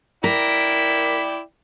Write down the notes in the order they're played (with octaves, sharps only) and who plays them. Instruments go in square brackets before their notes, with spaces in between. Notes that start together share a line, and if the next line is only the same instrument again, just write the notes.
[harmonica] E4 D5 G5 [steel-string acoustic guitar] A#4 [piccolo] B6